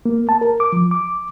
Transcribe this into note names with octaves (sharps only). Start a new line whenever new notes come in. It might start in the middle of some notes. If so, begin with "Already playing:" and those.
A#3
A5
A#4
D6
F3
D6